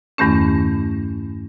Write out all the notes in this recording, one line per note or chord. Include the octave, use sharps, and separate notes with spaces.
E2 G2 D#3 A3 C#4